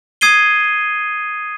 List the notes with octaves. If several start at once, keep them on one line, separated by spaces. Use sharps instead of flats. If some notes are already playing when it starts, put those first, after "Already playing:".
D#6 G#6 C7 D#7 G7